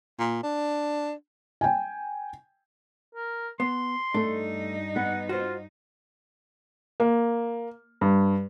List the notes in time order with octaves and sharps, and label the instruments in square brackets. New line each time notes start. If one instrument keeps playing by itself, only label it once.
[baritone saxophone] A#2
D4
[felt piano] G5 G#5
[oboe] A#4
[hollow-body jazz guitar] B3 [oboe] C6
[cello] G2 D#4 [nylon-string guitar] A3 A4 [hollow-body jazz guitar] D4
[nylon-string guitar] B3 B4 [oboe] F#5
[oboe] F4 [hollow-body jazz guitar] F#4 C5
[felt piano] A#3
G2